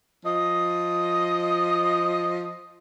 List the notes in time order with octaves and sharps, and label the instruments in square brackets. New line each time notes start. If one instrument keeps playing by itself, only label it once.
[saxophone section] F3 D#5